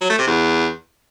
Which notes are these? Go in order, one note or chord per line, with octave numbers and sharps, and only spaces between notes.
F#3
A3
C3
E2